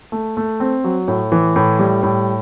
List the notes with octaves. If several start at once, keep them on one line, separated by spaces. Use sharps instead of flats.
A3
A3
C4
F#3
A2
E3
A2
G3
A2